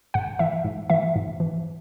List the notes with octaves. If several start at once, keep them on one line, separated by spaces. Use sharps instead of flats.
G#2 F#5
E3 E5
G#2
E3 E5
G#2
E3